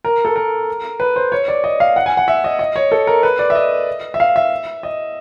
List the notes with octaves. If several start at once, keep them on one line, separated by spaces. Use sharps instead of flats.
A#4
A4
A#4
B4
C5
C#5
D5
D#5
F5
F#5
G#5
F#5
E5
D#5
D#5
C#5
A4
A#4
B4
D5
E5
D#5
E5
F5
E5
D#5